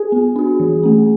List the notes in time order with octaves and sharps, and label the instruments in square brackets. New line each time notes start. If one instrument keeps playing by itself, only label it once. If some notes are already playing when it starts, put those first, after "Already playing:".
Already playing: [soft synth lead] G#4
[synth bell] B3
D4 F#4
E3
A3 C#4